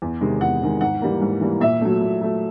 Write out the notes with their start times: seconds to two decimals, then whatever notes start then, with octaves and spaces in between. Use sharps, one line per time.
0.02 E2
0.21 C3 D#3 G#3
0.41 E2 F#5
0.62 C3 D#3 G#3
0.81 G#2 F#5
1.02 E3 G3 A#3
1.21 G#2
1.41 E3 G3 A#3
1.61 A#2 E5
1.81 F#3 A3
2.01 A#2
2.21 F#3 A3